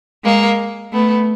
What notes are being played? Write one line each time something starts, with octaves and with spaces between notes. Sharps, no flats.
G#3 A#3
A3 B3